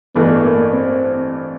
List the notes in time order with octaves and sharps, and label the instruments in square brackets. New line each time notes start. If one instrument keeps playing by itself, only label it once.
[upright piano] A1 G2 E3 A3 D4 [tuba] B3
[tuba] A#3
C4